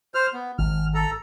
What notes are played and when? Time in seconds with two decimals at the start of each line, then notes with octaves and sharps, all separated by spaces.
0.15 C5 F6
0.34 B3
0.58 G#1 F6
0.95 A4 A#5